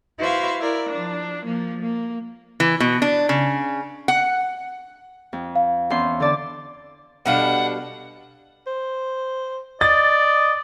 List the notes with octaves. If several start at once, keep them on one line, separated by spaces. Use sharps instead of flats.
E4 F#4 B4 C5 E5 F5
E4 A#4 D5
F3 D4
F3 A#3
A#3
E3
B2
D4
C#3
F#5
F2
F5
E2 C#4 C6
D3 D5 A5
B2 G3 D4 A4 F5 F#5
C5
D5 D#5 A6